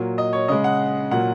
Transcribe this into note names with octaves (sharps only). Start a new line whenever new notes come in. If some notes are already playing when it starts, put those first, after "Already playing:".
Already playing: A#2 F#3 A#3
D#5
C#5
C#3 G#3 D#5
F#5
A#2 F#3 A#3 F#5